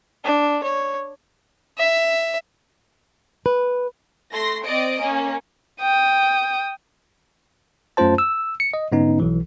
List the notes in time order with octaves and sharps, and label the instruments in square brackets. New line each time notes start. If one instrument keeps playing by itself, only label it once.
[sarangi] D4
C#5
[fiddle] E5
[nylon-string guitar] B4
[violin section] A3 C6 A#6
C4 D5 D#5 D7
A#3 C#4
[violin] G5 D#6
[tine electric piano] F#2 A3 C#4 F4 C5 A5
E6
C#7
D#5
G#2 D3 B3 C#4 D#4
B1 E3